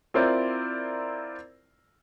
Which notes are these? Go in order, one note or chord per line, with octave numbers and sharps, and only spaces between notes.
C4 E4 F4 A#4 C5 D5